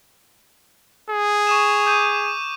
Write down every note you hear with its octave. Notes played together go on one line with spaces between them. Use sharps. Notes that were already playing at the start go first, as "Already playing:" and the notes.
G#4
C#6 D#6 E7
D6 G6 D#7